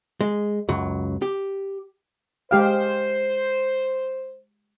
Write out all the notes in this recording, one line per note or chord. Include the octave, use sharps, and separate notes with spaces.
G#3
C#2 F#2 F#3
G4
G#3 G4 C5 F5